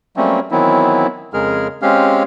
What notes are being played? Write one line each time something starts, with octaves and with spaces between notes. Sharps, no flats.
F#3 G3 A3 A#3 C4 C#4
D#3 E3 F#3 B3 C4 E4
F2 C#3 G#3 G#4 A#4 F6
G#3 C4 C#4 G4 F5 F6